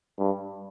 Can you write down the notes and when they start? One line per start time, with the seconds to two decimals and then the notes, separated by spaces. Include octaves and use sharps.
0.19 G2